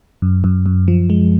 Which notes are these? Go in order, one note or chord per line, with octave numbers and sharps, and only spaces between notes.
F#2
F#2
F#2
F3
G#3